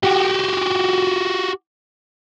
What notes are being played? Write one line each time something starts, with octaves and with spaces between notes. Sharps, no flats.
F#4 G4